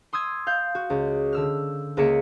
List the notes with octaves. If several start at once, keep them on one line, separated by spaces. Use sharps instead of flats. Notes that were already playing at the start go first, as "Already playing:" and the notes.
C6 D#6 E6 G#6
F5 G6
F#4
C#2
D3 E6 F6
C#2 A#3 G#4 E5 C#7